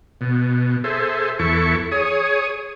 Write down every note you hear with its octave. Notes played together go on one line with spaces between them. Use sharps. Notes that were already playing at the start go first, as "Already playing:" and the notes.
B2
G#4 A4 C5 E5
E2 E4 A4 C#6
G#4 C#5 D#6